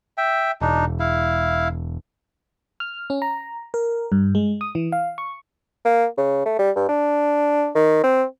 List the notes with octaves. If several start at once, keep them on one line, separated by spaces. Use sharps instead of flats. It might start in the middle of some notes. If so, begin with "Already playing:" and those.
E5 G5
E1 D4 D#4
E4 F5
F6
C#4
A#5
A#4
G2
G#3
D#6
E3
F5
C#6
A#3
C#3
A3
G3
G2
D4
D#3
C4